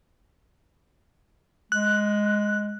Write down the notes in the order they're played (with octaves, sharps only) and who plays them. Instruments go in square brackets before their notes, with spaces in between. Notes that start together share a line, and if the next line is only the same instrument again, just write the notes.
[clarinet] G#3 [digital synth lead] F#6